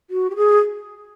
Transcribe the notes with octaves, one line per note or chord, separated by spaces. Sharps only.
F#4
G4
G#4